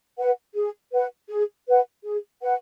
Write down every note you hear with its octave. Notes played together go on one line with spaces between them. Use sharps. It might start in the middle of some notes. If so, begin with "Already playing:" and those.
B4 F#5
G#4
B4 F#5
G#4
B4 F#5
G#4
B4 F#5